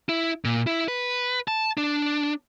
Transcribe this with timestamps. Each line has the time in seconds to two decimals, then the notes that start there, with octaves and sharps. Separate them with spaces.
0.09 E4
0.45 A#2
0.67 E4
0.88 B4
1.48 A5
1.78 D4